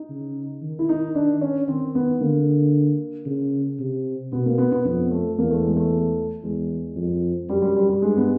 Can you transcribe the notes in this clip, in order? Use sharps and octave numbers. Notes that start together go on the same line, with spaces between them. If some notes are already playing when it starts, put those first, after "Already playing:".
Already playing: D#4
C#3
D#3
E4
D#4
D4
C#4
D#3 C4
B3
D3 A#3
C#3
C3
B2 B3
A#3
B3
B3
F2 B3
A3
E2 A#3
A3
G#3
A3
E2 G#3
F2
F#2 G3
G3
G3
G3
G2 G#3
B3